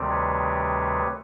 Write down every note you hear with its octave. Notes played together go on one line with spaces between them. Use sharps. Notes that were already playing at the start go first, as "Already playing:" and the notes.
Already playing: D2 C3 D#3 G3 C4
B4 C#5